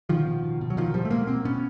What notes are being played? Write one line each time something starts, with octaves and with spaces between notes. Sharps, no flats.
B2 D#3 F3
B2
B2
B2
F#3
B2 D#3 F3
B2 F3 G3
A3
B2 G#3 A#3
B2 A#3 C4
B2 B3 C#4